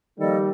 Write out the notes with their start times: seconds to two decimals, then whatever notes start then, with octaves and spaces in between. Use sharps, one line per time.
0.19 D#3 F3 G3 A#3 D#4 A4 D#5